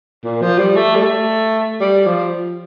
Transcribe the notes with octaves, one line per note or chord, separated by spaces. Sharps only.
A#2
F3
G3
A3
G3
A3
G3
F3